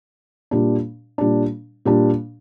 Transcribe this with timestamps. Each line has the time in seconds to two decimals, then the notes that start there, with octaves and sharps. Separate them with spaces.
0.51 A#2 G3 D4
1.18 A#2 G3 D4
1.85 A#2 G3 D4